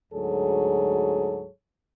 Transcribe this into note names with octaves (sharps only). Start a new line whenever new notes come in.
D2 G#2 F#3 G#4 A4 C#5